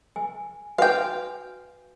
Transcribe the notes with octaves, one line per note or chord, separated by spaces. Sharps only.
G#5
F#4 B4 F5 G5 G#5